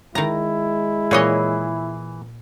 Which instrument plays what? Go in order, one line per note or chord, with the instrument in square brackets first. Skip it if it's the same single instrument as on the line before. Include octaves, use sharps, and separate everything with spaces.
[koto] D#3 A#5 [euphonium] G#3 [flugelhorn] E4
[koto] A#2 C#5 D#5 [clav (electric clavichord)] E3 G#4